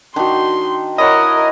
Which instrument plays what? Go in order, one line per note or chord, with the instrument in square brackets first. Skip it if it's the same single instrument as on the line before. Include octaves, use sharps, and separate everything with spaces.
[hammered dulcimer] D#3 [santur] D4 F#4 [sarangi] C6
[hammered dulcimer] E4 C#5 F#5 [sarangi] A#4 [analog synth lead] D#5